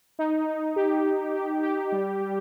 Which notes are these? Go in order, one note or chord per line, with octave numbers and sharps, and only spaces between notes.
D#4
D#4
G4
D#4
G4
G4
G3
G3